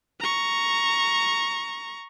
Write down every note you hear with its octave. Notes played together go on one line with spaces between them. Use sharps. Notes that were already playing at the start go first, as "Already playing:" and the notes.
A#5 C#6